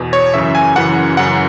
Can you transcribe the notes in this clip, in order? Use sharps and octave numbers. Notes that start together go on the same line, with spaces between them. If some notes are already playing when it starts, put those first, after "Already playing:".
Already playing: E2 B2
C#5
F#2 C#3 E3 E5
G#5
F#2 C#3 E3 F#5
F#2 C#3 E3 F#5